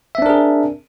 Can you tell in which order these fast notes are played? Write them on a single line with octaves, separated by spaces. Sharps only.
E5 C4 D4 A#4 G#4